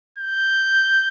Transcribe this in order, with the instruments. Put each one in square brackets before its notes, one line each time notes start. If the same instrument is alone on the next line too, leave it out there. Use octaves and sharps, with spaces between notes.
[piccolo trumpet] G6